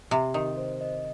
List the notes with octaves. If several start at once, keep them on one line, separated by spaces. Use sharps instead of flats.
C3 G4
D#3 D#5
C5
D#5